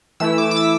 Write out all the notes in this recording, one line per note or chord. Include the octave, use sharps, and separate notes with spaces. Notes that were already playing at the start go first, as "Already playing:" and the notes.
E3 A3 E4 E6
D6
D6
E6